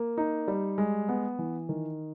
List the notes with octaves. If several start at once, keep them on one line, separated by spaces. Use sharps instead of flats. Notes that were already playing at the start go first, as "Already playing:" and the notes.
Already playing: A#3
D#4
G3
G#3
B3
E3
D#3